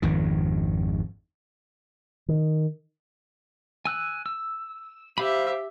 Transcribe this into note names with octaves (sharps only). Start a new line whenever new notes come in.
G#1 F2 D#3
D#3
G#5 E6 F#6
E6
G4 C5 E5 F5 B5